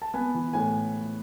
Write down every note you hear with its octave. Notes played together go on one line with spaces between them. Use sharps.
A5
B3 G#5
E3
A2 G#5